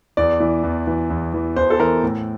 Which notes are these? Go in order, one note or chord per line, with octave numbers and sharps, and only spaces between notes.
E2 D5
E3
E2
E3
E2
E3
E2 C5
A4
E3 A#4
A2